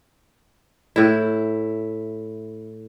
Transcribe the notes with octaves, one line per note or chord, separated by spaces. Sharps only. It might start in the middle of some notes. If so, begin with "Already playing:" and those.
A2 E4